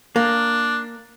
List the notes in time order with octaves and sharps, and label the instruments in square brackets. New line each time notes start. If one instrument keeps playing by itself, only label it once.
[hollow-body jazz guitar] A#3 [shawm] D4